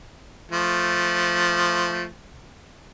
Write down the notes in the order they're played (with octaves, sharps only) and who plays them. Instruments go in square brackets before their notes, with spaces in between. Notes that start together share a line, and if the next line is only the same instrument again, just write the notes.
[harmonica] F3 A3